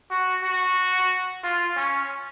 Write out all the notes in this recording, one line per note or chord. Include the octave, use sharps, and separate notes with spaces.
F#4
F#4
F4
C#4